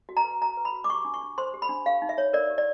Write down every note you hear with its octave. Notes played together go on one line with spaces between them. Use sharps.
F#4
A#5
B4
F#4 A#5
B4
B5
F#4
D6
G4 C#6
D4
C#6
D4
C5 C6
G4
B5
D4
G4 F5
D#4
E5
C#5
A#4 D5
G4
D5